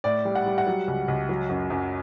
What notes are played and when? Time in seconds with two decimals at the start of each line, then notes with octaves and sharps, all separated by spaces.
0.04 A2 D5
0.25 G3
0.35 F#5
0.46 G3
0.58 F#5
0.67 F#3
0.88 C#2
1.08 C#2
1.29 F#3
1.49 F#2
1.70 F#2